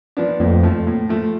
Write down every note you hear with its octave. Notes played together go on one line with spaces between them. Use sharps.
F3 B3 D4
F2 A2
F3 A3
A2
F3 A3